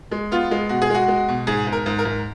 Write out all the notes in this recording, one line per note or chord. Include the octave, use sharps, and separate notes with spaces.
G#3
B3 F4
G#3
B2 F#4
G#4
G#3 F#4
G#3
B2
G#2 G#4
G#2
A#4
G#2
A#4
G#2